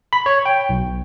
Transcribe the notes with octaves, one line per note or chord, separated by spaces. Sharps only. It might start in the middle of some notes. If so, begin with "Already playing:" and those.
B5
C#5
G5
B1